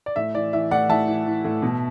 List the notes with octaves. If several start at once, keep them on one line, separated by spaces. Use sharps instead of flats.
D5
A2 E5
E3 D5
E3 E5
A2 D5 F#5
A2 E5 A5
E3
E3
A2
B2